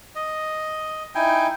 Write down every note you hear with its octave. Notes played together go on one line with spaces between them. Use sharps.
D#5
D#4 E4 G5 G#5